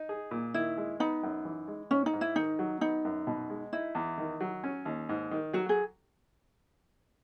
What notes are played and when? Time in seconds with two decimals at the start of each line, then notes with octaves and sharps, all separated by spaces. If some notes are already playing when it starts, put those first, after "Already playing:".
Already playing: D#4
0.09 G#4
0.31 A#2
0.54 D#3 E4
0.77 G#3
1.00 B3 D#4
1.23 F#2
1.45 E3
1.68 G#3
1.90 G#2 C#4
2.06 D#4
2.13 G#2
2.21 E4
2.36 D#3 D#4
2.59 F#3
2.81 B3 D#4
3.05 F#2
3.27 B2
3.50 G#3
3.73 D#4 E4
3.95 E2
4.18 D#3
4.41 F#3
4.64 C#4
4.85 D#2
5.09 G#2
5.31 D#3
5.53 F#3 F#4
5.69 G#4